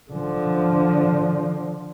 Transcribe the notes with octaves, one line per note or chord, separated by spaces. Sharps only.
D3 F3